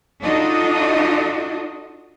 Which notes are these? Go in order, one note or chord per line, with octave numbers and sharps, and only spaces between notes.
D4 D#4 F4 F#4 A4 D#5